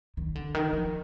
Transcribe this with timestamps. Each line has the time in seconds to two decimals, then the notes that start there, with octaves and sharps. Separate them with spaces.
0.17 D#3
0.35 D3
0.54 D#3
0.73 F3